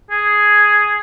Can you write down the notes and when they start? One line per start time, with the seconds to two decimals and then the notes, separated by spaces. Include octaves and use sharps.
0.11 G#4